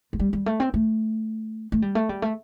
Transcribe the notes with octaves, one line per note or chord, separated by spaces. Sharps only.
A3
G3
G3
A3
C4
A3
A3
G3
A3
G3
A3